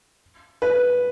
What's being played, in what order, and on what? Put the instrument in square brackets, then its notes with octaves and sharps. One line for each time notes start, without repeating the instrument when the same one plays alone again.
[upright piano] B4